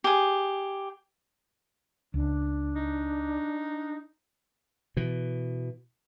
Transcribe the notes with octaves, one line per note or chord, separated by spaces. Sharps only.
G4 G#4
C#2 D4
D#4
B2 E3